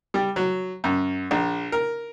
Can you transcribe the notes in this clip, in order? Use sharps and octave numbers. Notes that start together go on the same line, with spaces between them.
G3
F#3
F#2
A#1
A#4